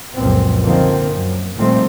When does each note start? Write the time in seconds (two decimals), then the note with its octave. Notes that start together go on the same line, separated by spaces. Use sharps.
0.15 C#2 F#2 A#2 F3 C4
0.64 D3 D#3 F3 A#3 C4
1.11 F#2
1.56 A#2 D#3 F3 G3 A3 C4